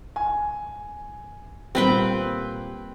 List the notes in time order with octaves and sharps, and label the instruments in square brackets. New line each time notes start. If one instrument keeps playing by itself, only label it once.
[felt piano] G#5
[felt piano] A#2 G3 [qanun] C4 B4 G5